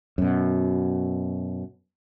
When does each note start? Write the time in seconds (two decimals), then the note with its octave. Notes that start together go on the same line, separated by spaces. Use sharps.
0.18 F#2 B2